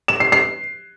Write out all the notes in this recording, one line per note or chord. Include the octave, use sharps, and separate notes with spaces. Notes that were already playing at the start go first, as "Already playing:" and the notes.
E7
C7
C7